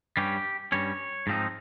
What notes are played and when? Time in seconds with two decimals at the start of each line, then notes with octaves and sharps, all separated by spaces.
0.17 G2 G3 C#4 G4
0.72 G2 G3 C#4 C#5
1.27 G#2 F3 C4 D#4